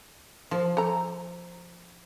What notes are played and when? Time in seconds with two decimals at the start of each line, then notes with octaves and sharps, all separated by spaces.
0.51 F3
0.77 A4 A#5